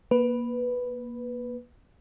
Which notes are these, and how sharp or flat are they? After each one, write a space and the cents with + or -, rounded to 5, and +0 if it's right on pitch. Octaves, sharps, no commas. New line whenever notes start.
A#3 +25 B4 +0